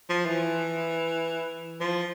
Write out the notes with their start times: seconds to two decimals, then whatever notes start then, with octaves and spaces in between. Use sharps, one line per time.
0.10 F3
0.26 E3
1.81 F3